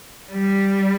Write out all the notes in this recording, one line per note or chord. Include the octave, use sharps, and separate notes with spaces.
G3